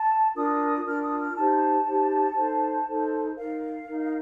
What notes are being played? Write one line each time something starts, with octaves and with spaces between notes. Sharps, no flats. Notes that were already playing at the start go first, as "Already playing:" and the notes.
Already playing: A5
D4 F4 A#4 D#6
D4 F4 A#4 F6
D#6
F6
D#4 G4 C5 A5
D#4 G4 C5
D#4 A4 C5
D#4 A4 C5
D#4 A#4 F5
D#4 A#4